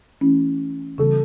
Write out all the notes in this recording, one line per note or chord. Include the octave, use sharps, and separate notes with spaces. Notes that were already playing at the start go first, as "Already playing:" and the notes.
E3 A3 C#4 E4
C#3 E3 G3 B3 F#4 A4